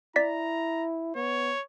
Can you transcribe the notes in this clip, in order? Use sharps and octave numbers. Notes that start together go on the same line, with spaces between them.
E4 D5 A#5 B6
B3 C#5